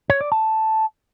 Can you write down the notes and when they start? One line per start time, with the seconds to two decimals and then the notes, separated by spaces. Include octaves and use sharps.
0.10 C#5
0.21 D5
0.32 A5